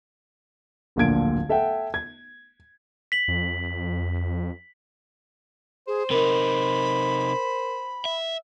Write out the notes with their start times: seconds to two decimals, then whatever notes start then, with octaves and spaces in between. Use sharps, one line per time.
0.96 D1 A#1 A#2 D3 G#6 D7
1.49 A4 E5 F#5 G5
1.94 G#6
3.12 B6 F#7
3.28 F2
5.87 G#4 C5
6.11 C3 D#4 A#4 B5
8.05 E5